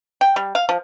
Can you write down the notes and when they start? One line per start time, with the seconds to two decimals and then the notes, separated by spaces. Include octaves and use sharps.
0.21 G5
0.36 G3
0.55 F5
0.69 F3